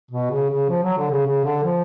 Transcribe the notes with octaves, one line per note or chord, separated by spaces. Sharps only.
B2
C#3
C#3
F3
F#3
D3
C#3
C#3
D3
F3